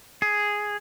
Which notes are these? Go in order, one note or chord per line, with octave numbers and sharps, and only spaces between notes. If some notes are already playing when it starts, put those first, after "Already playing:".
G#4